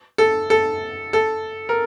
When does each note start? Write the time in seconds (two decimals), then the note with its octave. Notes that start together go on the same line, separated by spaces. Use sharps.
0.18 A4
0.50 A4
1.13 A4
1.69 A#4